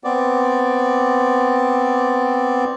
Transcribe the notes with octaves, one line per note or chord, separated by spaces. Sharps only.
B3 C4 D5